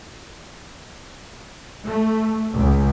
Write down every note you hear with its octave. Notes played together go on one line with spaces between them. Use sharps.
A3
C#2